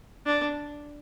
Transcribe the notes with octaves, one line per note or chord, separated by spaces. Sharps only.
D4